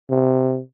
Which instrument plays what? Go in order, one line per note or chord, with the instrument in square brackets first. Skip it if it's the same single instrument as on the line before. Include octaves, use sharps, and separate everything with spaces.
[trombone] C3